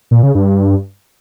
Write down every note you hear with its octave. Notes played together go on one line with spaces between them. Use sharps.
A#2
C#3
G2